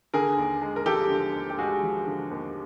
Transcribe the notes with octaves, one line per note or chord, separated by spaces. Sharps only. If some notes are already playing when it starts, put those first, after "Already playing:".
D3 G#4 A#4
D#2
G#3
A#4
F3 G4 A4
D3
D#2
G4
G#3 F#4 G#4
F3
D3
D#2